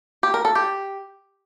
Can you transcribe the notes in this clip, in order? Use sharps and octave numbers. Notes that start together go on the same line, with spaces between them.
G4
A#4
A4
G4